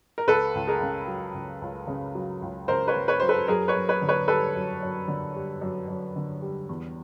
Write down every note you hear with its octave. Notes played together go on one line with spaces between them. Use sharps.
A#4
C#2 A4 B4
C#2
G#4 A#4
C#3
F#3
C#2
C#2
C#3
F#3
C#2
C#2 A#4 C5
B4 C#5
C#3
B4 C#5
F#3 C5
A4 B4
F#2 G#4 A#4
B4 C#5
F#2
B4 C#5
D3
B4 C#5
G3 A4 B4
F#2
F#2
D3
G3
F#2
F#2
D3
G3
E2